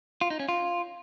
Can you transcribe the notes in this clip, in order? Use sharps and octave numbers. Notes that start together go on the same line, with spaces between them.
F4
D#4
C#4
F4